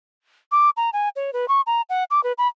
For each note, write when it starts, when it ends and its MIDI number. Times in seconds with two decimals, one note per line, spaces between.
0.52 0.70 86
0.77 0.90 82
0.93 1.09 80
1.16 1.33 73
1.33 1.48 71
1.48 1.61 85
1.67 1.81 82
1.89 2.04 78
2.11 2.23 86
2.23 2.32 71
2.38 2.48 83